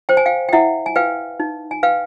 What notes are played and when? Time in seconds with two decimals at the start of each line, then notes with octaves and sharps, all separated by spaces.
0.09 C5 G5
0.17 G#5
0.26 F5 G5
0.49 G5
0.53 E4 E5 F#5
0.86 G#5
0.96 B4 F5 G5
1.40 D#4
1.71 G#5
1.83 B4 F5 G5